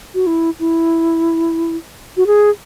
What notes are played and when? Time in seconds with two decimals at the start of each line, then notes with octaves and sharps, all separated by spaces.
0.14 F#4
0.27 E4
0.59 E4
2.17 F#4
2.27 G#4